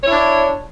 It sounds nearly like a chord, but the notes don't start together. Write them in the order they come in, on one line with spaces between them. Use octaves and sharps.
C#5 E4 D4